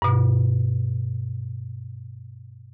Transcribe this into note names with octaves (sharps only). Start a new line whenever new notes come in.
G2 B2